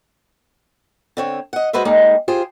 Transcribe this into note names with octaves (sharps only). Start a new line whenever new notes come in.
D3 C4 C#5
D#5 F#5
G#3 F#4 B4 C5 E5
G3 G#3 A#3 D#4
F4 G4 G#4 C5